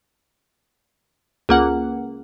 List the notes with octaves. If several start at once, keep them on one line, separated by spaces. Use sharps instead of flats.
C#2 A#3 F#5